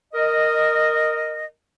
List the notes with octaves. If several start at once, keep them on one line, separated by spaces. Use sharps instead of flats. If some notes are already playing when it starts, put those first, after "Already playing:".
A#4 D#5